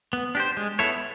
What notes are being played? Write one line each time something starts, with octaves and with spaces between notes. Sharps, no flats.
B3
D4 G4 C5
G#3
B3 E4 A4 C#5